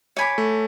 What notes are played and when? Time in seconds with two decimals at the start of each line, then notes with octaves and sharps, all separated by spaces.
0.17 C#5 G#5 B5 D6
0.38 A3